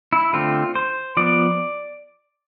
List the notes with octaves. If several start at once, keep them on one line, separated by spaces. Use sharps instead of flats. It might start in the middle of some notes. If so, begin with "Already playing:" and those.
E4
D3 A3 C4 F4
C5
F3 B3 D5